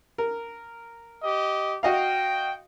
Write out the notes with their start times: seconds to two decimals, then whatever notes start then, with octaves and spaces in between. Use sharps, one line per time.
0.18 A#4
1.23 G4 D#5
1.83 F#4 D#5 F5 G5